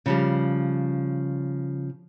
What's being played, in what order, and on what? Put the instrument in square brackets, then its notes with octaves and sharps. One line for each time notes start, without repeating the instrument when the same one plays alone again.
[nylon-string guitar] C#3 F3 G3